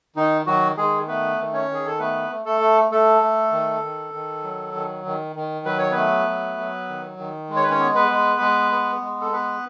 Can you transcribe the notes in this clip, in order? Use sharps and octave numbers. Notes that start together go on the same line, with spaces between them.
D#3 D#4
D#3 F#3 F#4
D#3 G#3 G#4
A3 B3 B4
D#3
C#4 C#5
D#3
G#4
A4
A3 B3 B4
A3
A3 A4
A3
A3 A4
A3
D#3
D#3
D#3
F#3
D#3
D#3
D#3
F#3 B4
C#5
B3 B4
A3
F#3
F#3
D#3
D#3
G#3
C#5
B4
C#4 C#5
B3
B3 B4
G#3
G#3
B3
G#3
A4
B3 B4